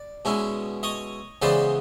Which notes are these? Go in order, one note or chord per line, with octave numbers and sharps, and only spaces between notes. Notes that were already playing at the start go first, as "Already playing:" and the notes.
Already playing: D5
B2 G#3 C#4 E4
C#5 D#5
C#3 E3 G#3 B3 C5 D5